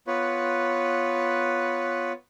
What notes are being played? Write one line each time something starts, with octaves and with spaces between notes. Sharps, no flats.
B3 F4 B4 C#5